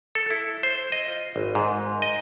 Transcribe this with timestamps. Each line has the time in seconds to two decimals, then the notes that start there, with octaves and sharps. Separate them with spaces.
0.15 A4
0.30 E4
0.63 C5
0.92 D#5
1.08 F4
1.36 G#1
1.55 G#2
2.02 D#5